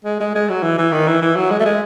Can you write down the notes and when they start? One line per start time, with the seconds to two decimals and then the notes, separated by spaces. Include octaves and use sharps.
0.05 G#3
0.20 G#3
0.35 G#3
0.49 F#3
0.63 E3
0.78 E3
0.92 D#3
1.07 E3
1.22 E3
1.36 F#3
1.51 G#3
1.60 A3
1.66 G#3